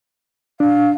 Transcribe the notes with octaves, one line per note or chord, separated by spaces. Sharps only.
D4 F5